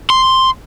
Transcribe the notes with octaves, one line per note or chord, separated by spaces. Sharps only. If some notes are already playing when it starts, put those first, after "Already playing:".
C6